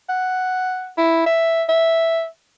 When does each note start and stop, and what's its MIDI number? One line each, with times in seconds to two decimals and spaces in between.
0.09 0.91 78
0.98 1.25 64
1.26 1.64 76
1.69 2.26 76